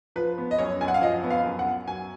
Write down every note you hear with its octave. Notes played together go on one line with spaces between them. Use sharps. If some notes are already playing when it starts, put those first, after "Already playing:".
F3 B4
B3
D#5
F#2 C#5
F#2 G#5
F#5
F5
F3 D#5
B3
F5
F#2
F#5
F#2
F#3 G#5